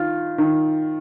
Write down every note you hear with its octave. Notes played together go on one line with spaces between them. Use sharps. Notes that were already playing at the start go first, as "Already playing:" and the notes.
Already playing: D#3 F4
D#3